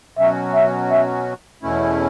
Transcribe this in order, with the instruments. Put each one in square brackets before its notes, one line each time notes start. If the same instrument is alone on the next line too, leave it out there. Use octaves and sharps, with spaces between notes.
[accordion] B2 F#3 C#4 F#4 [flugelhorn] E5
[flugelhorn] E5
E5
[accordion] E2 B2 A3 C#4 E4